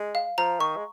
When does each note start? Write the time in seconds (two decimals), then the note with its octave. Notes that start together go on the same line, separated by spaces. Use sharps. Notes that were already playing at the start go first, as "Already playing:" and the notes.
Already playing: G#3
0.15 F5
0.38 F3 A#5
0.60 D#3 C#6
0.76 G#3